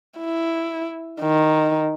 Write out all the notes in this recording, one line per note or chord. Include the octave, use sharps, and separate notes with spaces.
E4
D#3